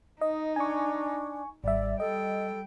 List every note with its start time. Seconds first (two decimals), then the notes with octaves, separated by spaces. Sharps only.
0.21 D#4 D#5
0.56 D4 G#5 C#6
1.64 G#1 G3 D5 E5
2.00 G3 A4 D#5 G5